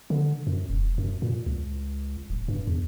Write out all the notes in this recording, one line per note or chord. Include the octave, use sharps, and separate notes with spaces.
D3
F#2
E1
F#2
A#2
C#2
D1
G2
E2